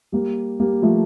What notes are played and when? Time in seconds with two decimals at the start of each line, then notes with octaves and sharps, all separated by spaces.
0.12 G3 A#3
0.60 G3 A#3
0.82 F3 A3